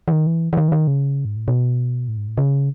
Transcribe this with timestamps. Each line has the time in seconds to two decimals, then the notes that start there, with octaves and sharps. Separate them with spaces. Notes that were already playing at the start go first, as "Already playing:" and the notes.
0.08 E3
0.12 D#3
0.27 E3
0.53 E3
0.57 D#3
0.68 E3
0.72 D#3
0.87 C#3
1.25 G#2
1.36 A2
1.48 B2
2.08 A2
2.17 G#2
2.28 A2
2.38 C#3